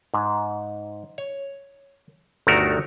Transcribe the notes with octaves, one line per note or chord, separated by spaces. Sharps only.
G#2
C#5
G1 D2 D#3 A3 F#4 A#4